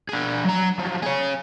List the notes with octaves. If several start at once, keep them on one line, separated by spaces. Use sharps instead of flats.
D4 G#4
F#3 A#5
F3 F#3
G#4 C#5